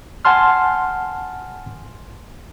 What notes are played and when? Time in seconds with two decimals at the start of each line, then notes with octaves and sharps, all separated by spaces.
0.25 F#5 G#5 A5 C6 F6